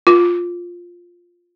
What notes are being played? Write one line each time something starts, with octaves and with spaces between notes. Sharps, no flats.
F4